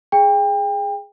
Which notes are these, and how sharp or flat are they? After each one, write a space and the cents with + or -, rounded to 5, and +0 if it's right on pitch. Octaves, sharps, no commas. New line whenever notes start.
G#4 +0 G5 +30